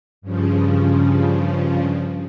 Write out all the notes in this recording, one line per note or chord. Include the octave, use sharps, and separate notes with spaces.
G2 C#3 F3